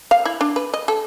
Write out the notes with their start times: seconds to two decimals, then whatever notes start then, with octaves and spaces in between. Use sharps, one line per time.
0.11 F5
0.26 E4
0.41 D4
0.56 B4
0.74 D#5
0.88 A4